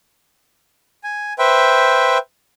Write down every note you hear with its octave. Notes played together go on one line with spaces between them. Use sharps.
G#5
B4 C5 E5 G5